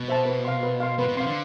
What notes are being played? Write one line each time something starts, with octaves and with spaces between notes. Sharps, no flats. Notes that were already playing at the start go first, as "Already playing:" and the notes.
Already playing: B2
C5 E5 A5
B4
F5 C6
B4
F5 C6
B2 B4
B2
C3 F5 C6
D3